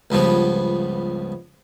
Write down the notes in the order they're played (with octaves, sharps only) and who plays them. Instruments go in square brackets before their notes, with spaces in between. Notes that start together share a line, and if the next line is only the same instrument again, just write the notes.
[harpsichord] C#2 G2 F3 B3